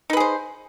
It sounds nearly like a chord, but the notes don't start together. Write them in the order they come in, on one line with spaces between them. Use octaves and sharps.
D#4 B4 G#4 C5